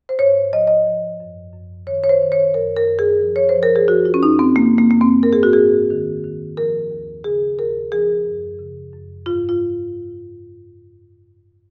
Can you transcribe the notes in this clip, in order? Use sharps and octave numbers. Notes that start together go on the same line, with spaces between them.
C5
G#2 C#5
F3 D#5
D#5
F3
F#2
F#2
D#3 C#5
C#5
C5
D#3
C#5
F#2 A#4
A#4
F#2
G#4
F3
C#5
C5
F3
A#4
G#4
F3 F#4
F4
C#4
F#2 D#4
C4
C#3 A#3
A#3
F#2 A#3
C4
G#2 A#4
G#4
F#4
G#2 G#4
D#3
D#3
F3 A#4
D#2
C#3 G#4
D#2 A#4
F3 G#4
F#2
C#3
F#2
G#2 F4
F4